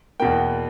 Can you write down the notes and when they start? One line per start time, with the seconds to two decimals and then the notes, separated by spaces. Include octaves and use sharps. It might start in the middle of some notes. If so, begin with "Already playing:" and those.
0.20 E2 B2 A#3 G5